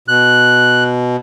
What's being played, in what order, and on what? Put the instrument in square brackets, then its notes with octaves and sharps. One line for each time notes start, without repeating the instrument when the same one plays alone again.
[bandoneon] B2 [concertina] F#6